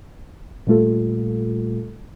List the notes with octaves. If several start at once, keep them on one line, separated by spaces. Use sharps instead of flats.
A#2 G3 A3 F4 A4